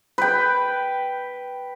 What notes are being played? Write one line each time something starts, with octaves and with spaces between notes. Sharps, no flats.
B4 G5